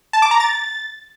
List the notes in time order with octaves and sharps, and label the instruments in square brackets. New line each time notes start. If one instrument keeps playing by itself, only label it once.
[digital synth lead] A5
D6
A#5
A6